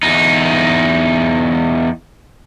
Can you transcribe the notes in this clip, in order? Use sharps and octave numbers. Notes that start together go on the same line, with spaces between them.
E2 D#4